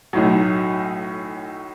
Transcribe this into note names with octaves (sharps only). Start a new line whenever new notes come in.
B1 A2 F#3